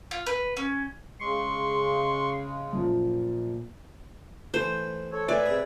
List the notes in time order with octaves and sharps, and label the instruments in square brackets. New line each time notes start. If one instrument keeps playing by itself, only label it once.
[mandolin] F4
B4
C#4
[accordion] C#3 G#3 [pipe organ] C6 C#6
[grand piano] F#2 F3 [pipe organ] A#2
[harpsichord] E3 A3 G5 [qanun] C5
[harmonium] A4 C#5
[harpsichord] A2 [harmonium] B4 E5 G#5 [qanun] D5
[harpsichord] C3 G#4